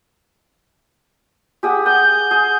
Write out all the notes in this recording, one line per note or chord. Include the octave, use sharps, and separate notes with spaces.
G4 G#4 F#5
F#5 D#6 G6
G#4